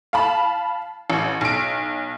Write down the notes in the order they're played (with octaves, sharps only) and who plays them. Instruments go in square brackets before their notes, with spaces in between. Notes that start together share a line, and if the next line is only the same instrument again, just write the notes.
[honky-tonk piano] F5 A5 B5
A1
B1 D7